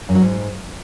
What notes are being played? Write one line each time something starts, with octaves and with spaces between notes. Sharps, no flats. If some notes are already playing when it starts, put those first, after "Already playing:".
F#2
F#3
G#2